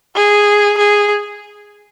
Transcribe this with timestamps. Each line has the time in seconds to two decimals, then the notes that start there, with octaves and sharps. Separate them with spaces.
0.16 G#4
0.78 G#4